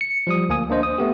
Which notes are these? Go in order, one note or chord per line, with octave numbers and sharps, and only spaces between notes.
C#7
F3 G3 D#6
D2 A#3 G#5 D#6
A#3 D4 C5 D#5
D#6
A3 B3 G4